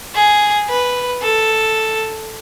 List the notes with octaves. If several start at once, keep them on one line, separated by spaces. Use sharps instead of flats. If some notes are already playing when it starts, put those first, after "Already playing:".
G#4
B4
A4